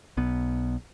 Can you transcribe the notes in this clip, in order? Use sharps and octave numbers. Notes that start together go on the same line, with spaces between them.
B1 B3